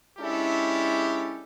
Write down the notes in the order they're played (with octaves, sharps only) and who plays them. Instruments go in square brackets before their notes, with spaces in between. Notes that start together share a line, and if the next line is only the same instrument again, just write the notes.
[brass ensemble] G#3 C#4 D4 E4 G4 A4